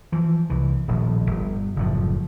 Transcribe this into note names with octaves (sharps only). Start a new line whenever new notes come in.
E3 F3
C2 E3
D#1 A#1 A2 F3
G1
F#1 A2 F3